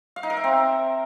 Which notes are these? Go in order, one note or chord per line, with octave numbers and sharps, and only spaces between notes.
F5
D#4
A#4
E5
C4